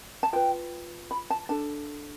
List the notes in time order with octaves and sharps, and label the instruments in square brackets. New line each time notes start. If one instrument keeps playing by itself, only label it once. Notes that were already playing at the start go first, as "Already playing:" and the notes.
[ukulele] A5
F4 B4 G5
B5
A5
D4 A4 A5